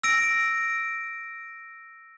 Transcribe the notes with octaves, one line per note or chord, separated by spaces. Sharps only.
E6 A#6 D7